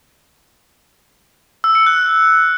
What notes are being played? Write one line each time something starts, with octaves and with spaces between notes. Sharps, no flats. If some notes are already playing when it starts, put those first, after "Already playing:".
E6
C#7
F#6